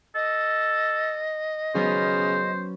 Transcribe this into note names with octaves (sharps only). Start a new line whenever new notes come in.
A4 D#5
C#3 F#3 B3 C#4 C5